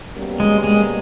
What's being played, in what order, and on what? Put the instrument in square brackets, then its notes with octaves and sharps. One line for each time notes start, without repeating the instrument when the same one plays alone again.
[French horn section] B2 G3 A#3 C#4 F#4
[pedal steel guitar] G#3
G#3